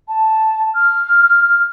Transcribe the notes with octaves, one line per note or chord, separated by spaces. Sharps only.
A5
F6